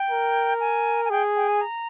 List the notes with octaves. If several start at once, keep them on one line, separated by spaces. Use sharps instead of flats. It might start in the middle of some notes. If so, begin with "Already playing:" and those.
Already playing: G5
A#4
G#5
G#5
G#4 G5
G5
G#5
A#5